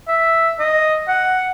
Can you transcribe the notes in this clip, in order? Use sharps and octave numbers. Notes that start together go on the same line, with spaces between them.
E5
D#5
F#5